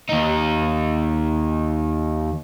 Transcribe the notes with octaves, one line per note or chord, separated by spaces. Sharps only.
D#2 D#4